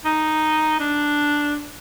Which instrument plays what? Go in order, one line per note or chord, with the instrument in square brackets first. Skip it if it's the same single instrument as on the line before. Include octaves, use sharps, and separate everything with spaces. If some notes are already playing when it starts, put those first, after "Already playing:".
[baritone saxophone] D#4
D4